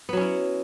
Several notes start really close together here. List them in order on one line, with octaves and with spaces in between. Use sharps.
B3 F#3 C#4 E4